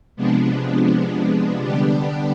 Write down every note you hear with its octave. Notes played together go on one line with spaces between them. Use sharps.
C3 F3 G#3 B3 D4
D3 G3 B3 D4 G4